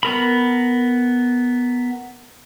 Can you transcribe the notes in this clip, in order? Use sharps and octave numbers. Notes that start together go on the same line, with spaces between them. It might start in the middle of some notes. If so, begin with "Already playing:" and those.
B3 A#4 B5